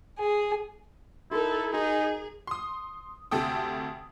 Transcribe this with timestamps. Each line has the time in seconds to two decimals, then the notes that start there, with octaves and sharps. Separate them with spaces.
0.20 G#4
1.31 D#4 E4 F#4 A4 A#4
1.73 D#4 F#4 G#4 G#5
2.47 C6 D#6
3.31 D2 C3 A4 G5 D#6